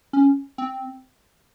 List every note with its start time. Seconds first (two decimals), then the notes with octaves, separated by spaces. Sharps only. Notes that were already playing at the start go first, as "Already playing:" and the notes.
0.13 C#4
0.58 C4